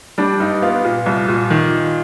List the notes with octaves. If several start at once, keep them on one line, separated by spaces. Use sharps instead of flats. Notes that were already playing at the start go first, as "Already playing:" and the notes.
G3 D4
G2 D#4
B3 F4
A#2
C2
A#2
D#3